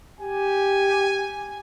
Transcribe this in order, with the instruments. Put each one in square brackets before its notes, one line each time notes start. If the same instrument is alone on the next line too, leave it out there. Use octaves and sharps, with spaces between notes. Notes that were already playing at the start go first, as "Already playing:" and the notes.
[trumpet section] G4 [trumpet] G#5